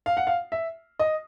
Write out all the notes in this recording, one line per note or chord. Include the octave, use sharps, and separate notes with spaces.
F5
F#5
F5
E5
D#5